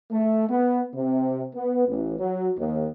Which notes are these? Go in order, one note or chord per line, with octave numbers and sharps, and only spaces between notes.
A3
B3
C3
B3
A1
F#3
D#2